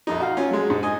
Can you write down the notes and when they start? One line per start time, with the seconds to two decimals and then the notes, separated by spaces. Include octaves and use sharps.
0.07 A#1 F2 D#4
0.20 F#4 F5
0.37 C#4 F4
0.51 F#3 G#3
0.70 G#2
0.83 D#5 G#5